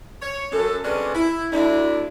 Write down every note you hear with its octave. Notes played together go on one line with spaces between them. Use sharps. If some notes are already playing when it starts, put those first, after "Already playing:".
C#5
F#2 A4
C3 G#3 C#4 D4 A4 B4
E4
D2 D4 E4